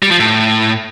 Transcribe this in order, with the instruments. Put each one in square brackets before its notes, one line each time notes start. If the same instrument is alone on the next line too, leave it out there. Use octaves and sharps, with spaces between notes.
[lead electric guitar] G3
F3
A2